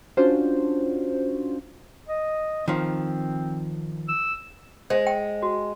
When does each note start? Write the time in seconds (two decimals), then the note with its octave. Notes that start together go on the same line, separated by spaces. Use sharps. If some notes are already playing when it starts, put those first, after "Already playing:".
0.17 C#4 D4 F4 F#4 C5
2.08 D#5
2.68 D#3 F3 C4
4.08 E6
4.90 G#3 C5
5.07 G5
5.42 F#4